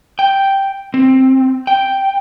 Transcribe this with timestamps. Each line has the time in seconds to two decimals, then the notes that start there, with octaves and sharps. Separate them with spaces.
0.19 G5
0.94 C4
1.67 G5